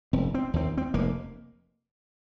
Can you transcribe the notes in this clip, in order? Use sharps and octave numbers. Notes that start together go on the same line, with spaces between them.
F1 C4
C4
D#2 C4
C4
F1 A#3